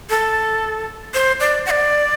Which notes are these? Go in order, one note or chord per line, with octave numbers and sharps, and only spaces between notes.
A4
C5
D5
F#5
D5